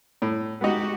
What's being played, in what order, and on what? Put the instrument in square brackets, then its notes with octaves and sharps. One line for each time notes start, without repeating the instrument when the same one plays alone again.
[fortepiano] A2
[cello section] G#3 F#4 G4 [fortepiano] B3 D#4